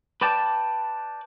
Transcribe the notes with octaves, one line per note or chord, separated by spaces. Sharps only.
B4 D5 G5 A5